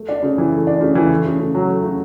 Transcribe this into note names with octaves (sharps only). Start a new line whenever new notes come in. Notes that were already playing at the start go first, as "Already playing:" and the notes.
Already playing: A3
D4
C#3
E3
A3
D4
C#3
E3
A3
C#3
C#3
F#3
A3
C#3